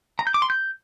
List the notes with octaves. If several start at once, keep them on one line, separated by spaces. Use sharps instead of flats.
A#5
G6
D6
C6
G6